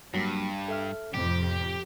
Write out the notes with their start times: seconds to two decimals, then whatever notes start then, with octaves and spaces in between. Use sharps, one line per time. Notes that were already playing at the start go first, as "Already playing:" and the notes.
0.14 G2 F#3 G3 A#3
0.68 A4 E5 F6
1.14 F2 A2 C3 G4